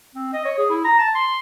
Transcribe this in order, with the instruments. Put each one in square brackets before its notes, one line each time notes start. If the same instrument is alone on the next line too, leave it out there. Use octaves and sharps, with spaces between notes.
[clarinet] C4
D#5
C#5
G#4
E4
A#5
A5
C6